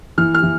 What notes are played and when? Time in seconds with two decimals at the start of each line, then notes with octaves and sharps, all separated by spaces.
0.18 E3 F6
0.34 F6
0.43 E3